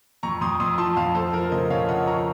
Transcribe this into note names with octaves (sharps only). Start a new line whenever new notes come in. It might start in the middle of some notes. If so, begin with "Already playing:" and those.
F2 A#5 C#6
F2 C6 D#6
F2 C6 D#6
F3 A5 C6
F2 F5 A5
F2 A4 C5
F3 A#4
C#3 C5 D#5
C#3 C#5 F5
F3 D#5 F#5
F3 A#5 C#6